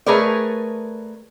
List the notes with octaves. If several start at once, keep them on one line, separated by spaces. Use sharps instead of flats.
A3 G#4 A#4 B4 C#5 D5